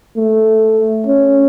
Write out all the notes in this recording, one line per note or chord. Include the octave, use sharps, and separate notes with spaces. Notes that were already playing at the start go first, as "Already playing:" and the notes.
A3
C#4